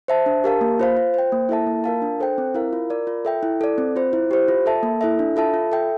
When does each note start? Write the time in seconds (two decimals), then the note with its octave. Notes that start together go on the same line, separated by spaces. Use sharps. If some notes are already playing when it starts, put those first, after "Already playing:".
0.08 C5 E5 A5
0.26 D4
0.44 G4 A#4 F5 A5
0.61 A#3
0.80 F4 C5 F5
0.97 F4
1.14 C5 G5
1.32 A#3
1.49 E4 A4 E5 A5
1.67 A#3
1.84 F4 A#4 F5 A5
2.02 D4
2.20 A4 C5 G5
2.38 C4
2.54 E4 A#4 F5
2.73 F4
2.90 A#4 D5
3.07 F4
3.25 A4 E5 G5
3.43 E4
3.61 A4 D5
3.78 C4
3.96 F4 C5
4.13 E4
4.31 G4 C5
4.48 F4
4.66 A4 E5 A5
4.83 A#3
5.01 E4 A4 E5
5.19 D4
5.36 F4 A4 E5 A5
5.54 F4
5.72 A4 E5 G5